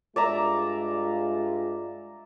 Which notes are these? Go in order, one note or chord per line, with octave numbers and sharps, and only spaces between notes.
G2 G#3 F4 D5 E5 A#5